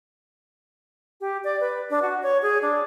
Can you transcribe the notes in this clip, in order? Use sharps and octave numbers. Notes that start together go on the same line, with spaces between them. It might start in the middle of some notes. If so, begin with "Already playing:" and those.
G4
D5
B4
D4
F#4
C#5
G#4
D4